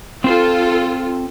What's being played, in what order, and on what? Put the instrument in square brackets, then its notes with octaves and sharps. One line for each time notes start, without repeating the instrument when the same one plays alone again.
[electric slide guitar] C4 C5 [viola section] F4 A4